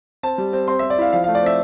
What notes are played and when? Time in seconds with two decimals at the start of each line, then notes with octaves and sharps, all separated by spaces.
0.23 C4 A5
0.38 G3
0.53 C4
0.68 C4 C6
0.79 C4 E5
0.90 D5
0.98 E4 F5
1.13 F3 F5
1.24 A3 F5
1.35 D5
1.43 C4 E5